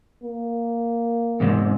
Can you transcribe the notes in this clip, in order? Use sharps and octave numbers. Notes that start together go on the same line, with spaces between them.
A#3
E2 G#2 C3